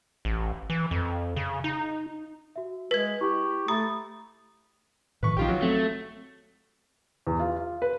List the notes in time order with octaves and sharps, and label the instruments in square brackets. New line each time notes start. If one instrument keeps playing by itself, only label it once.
[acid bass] A1
E3
F2
C#3
D#4
[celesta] F#4 E5
[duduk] G#3 [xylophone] B4 G#6 [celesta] B6
[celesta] E4 C#6 [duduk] G4
[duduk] A3 [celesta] A#5 B5 A6 [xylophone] D#6
[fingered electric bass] A2 D#3 F3 [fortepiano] B4 C#6
[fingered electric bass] A#1 [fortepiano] D#3 F4 G4
[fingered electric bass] F3 [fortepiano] F#3
[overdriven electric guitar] A3 [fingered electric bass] C4
[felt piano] E2
F4
F4
B4